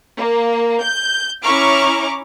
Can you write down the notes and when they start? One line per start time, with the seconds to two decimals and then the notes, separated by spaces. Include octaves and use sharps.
0.16 A#3
0.82 G6
1.43 C#4 E4 A#5 C#6 D6 F6